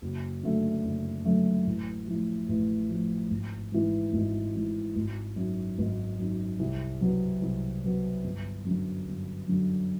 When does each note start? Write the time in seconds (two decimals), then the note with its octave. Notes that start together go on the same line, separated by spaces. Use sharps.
0.02 F#1
0.43 F#2 D3 F#3 A3
0.85 F#1
1.25 F#2 D3 F#3 A3
1.67 A1
2.07 A2 F3
2.49 A1
2.89 A2 F3
3.30 G#1
3.72 G#2 E3
4.13 G#1
4.55 G#2 E3
4.96 G#1
5.36 F#2 D#3
5.78 G#1
6.19 F#2 D#3
6.59 C2
7.01 B2 F#3 B3
7.42 C2
7.84 B2 F#3 B3
8.24 G1
8.65 F#2 D3 F#3
9.07 G1
9.48 F#2 D3 F#3